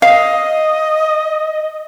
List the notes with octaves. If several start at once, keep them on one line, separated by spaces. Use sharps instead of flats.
D#5 F5